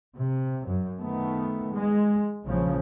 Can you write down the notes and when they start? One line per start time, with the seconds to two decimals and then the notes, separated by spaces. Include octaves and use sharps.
0.17 C3
0.67 F#2
1.01 D#3 A3 B3
1.73 G#3
2.43 A#1 C#3 F3